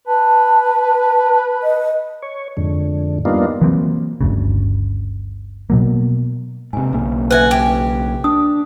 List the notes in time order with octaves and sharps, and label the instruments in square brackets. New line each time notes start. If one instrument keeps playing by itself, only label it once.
[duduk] B4 [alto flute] A5
[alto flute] D#5
[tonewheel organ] C#5
F2 G#2 D3
G3 A#3 B3 D4 D#4 F4
[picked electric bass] E3 F#3 A#3 C4
G1 D2 C#3
B2 F#3 A#3
[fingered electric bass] G#2 C3 [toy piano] G#5
[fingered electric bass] B1 C#3 A#3
[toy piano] B4 E5 [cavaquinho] F#5 G#5
[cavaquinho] G4
[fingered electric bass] D4 [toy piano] D#6